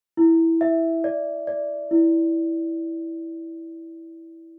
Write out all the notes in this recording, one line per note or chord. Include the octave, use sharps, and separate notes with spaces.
E4
E5
D5
D5
E4